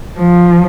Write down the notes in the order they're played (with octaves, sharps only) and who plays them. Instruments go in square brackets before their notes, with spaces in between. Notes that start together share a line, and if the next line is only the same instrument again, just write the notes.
[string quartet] F3